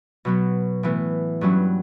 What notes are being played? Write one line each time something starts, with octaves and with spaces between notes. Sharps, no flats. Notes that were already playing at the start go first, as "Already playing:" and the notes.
B2 F#3 B3
A2 E3 B3
G2 F#3 C#4 E4